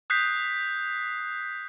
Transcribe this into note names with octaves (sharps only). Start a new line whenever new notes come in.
D#6 F#6 G6 B6 C7